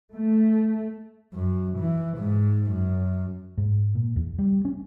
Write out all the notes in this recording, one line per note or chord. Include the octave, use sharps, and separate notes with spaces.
A3
F#2
E3
G#2
F#2
G#2
A#2
E2
G3
C#4